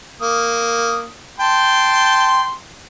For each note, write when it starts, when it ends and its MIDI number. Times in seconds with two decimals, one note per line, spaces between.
0.21 1.08 58
0.21 1.08 87
1.40 2.53 79
1.40 2.53 81
1.40 2.53 84